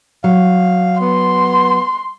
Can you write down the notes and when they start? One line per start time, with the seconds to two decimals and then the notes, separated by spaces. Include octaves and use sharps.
0.24 F#3 F5
1.01 B3 C6